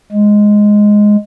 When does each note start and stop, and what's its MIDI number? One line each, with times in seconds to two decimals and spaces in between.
0.11 1.16 56